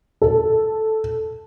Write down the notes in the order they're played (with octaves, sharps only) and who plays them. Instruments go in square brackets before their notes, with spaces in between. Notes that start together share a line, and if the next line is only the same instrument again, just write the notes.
[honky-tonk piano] A4